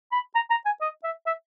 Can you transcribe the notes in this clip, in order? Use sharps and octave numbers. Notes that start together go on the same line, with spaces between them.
B5
A#5
A#5
G#5
D#5
E5
E5